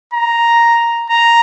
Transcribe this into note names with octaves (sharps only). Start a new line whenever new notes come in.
A#5
A#5